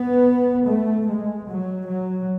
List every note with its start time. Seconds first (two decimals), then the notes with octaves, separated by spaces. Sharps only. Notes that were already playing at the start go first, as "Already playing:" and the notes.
Already playing: B3
0.64 A3
1.06 G#3
1.47 F#3
1.88 F#3